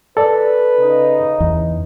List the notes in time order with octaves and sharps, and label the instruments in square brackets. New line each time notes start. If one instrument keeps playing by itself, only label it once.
[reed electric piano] A4 D5 [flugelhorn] B4
[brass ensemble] C#3 D#4
[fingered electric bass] E2